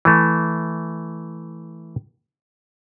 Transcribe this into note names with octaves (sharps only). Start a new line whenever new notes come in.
E3 A3